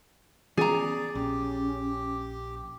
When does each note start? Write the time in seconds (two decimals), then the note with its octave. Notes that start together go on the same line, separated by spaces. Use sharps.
0.57 E3 B3 C#4 G#4 D5 A#5
1.15 A#1 C#4 G4